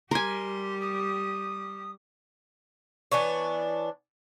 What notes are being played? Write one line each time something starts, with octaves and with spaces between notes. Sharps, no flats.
G3 G4 A#4 G#5 C6
D#6
E3 B3 D4 C#5